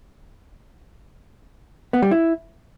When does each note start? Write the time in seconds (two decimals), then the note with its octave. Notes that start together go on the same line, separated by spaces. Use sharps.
1.93 B3
2.02 G3
2.11 E4